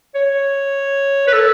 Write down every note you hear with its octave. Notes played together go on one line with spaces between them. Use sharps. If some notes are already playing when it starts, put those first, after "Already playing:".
C#5
B4
A4